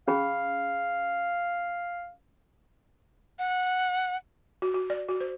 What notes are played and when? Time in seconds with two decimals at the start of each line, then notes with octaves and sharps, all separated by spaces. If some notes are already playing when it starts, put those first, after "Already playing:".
0.08 C#4 G#4 F5 B5
3.39 F#5
4.62 F#4
4.74 F#4
4.90 D5
5.08 F#4
5.21 C5